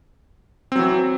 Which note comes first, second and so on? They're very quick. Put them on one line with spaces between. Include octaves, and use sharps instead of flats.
C4 F#3 E3